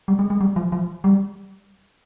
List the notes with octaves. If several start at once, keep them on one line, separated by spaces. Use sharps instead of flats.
G3
G#3
G#3
G3
F3
F3
G3